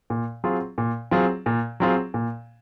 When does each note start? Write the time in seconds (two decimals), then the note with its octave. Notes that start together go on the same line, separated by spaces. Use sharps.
0.10 A#2
0.44 F#3 C4 F4 G#4
0.78 A#2
1.11 F#3 C4 F4 G#4
1.46 A#2
1.80 F#3 C4 F4 G#4
2.14 A#2